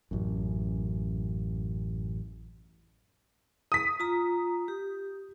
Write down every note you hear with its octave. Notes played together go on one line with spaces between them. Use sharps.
A1 F#2
D#6 B6
F4 A#5
G4